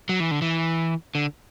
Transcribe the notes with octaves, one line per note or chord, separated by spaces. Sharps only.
F#3
E3
D3
E3
D3